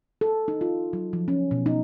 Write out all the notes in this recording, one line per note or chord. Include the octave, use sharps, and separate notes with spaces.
A4
D#4
F4
F#3
F3
C#4
B2
D#4